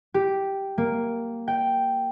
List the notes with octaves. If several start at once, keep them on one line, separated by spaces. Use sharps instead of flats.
G4
A#3
G5